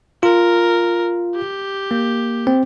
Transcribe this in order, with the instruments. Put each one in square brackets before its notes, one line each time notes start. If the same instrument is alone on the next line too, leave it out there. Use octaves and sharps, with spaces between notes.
[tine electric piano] F4 [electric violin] A#4
[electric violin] G4
[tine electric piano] A#3
C4